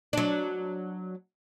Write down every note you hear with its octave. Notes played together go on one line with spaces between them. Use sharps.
F#3 D4